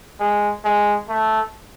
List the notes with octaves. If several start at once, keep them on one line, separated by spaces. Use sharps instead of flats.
G#3
G#3
A3